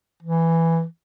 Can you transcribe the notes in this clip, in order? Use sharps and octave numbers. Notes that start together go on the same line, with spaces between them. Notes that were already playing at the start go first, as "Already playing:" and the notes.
E3